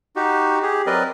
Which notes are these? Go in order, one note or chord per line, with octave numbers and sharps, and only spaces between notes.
D#4 F#4 G4
G4 G#4
F#3 C4 A#4 B4 D5 D#5